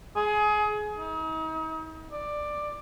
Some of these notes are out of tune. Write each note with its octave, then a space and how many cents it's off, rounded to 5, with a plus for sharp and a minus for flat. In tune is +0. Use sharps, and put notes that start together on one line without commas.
G#4 +25
D#4 +40
D5 +10